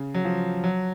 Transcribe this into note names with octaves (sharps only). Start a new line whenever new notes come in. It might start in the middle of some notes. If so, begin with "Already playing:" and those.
Already playing: C#3
F#3
F3
F#3